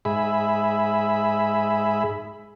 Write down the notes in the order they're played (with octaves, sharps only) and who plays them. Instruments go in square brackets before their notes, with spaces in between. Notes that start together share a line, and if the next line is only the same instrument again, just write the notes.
[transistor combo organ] G#2 G#4 E5 B5